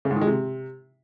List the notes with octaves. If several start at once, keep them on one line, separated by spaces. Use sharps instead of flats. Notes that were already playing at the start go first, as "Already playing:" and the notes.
C#3
G#2
D#3
G#3
C3